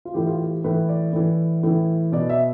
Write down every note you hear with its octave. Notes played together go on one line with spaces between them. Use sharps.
F4
A2 E3 G4
F4
G4
A2 E3 B4
D5
A2 E3
A2 E3
B2 D5
E5